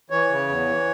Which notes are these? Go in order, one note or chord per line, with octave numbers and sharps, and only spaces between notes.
E3 C#5
C#3
E2
E3